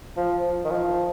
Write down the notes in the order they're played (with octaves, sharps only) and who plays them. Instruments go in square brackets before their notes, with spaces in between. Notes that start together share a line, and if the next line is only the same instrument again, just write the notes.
[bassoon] F3
D#3
F3